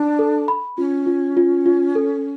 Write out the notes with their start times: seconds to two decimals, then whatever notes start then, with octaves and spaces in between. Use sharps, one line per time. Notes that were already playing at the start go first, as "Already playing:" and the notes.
Already playing: D4
0.19 A4
0.48 B5
0.77 C#4 F4
1.06 F4
1.37 F4
1.66 F4
1.95 A4